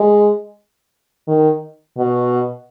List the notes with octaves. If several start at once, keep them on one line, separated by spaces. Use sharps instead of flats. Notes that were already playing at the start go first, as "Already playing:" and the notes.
Already playing: G#3
D#3
B2